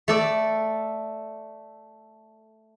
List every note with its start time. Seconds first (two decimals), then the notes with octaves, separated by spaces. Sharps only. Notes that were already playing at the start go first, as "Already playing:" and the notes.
0.08 A3 A4 D5